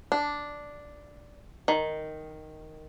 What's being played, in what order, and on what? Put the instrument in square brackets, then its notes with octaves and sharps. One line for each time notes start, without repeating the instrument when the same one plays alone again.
[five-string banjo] D4
D#3